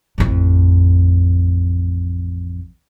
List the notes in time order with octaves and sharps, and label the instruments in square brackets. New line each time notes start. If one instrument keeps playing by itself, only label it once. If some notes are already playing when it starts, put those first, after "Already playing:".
[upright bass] A1 F2